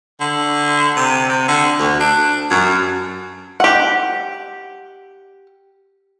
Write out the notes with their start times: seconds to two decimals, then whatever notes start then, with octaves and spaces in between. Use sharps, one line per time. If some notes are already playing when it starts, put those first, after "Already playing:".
0.20 D3
0.97 C3
1.29 C3
1.48 D3
1.79 D2
2.00 D4
2.50 F#2
3.60 G4 F#5